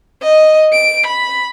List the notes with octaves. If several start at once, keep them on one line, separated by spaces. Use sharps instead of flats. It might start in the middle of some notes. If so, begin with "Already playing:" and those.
D#5
D7
B5